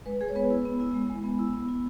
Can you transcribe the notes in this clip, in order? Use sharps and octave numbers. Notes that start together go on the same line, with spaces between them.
G#3 B4
G#3 G#4
C#5
B3 B4
E4
B3
E4
G#3
G#3
B3
E4
B3
E4